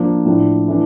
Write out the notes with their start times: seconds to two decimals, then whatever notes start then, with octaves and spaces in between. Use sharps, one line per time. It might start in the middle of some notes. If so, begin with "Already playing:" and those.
Already playing: F3 A#3 D4
0.26 A2 F3 A3 D4
0.68 E3 A3 D4